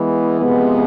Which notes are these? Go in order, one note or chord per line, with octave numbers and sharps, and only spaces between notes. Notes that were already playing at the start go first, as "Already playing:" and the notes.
Already playing: E3 G#3 B3
C3 F3 G#3 B3